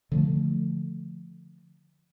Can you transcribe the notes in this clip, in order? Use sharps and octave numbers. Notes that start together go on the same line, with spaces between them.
D3 F3 A3